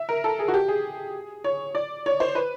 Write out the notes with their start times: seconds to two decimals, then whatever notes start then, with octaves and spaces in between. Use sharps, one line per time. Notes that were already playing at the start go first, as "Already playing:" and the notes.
Already playing: E5
0.09 A#4
0.24 A4
0.39 G#4
0.48 F#4
0.54 G4
0.68 G#4
1.44 C#5
1.75 D5
2.06 C#5
2.20 C5
2.35 B4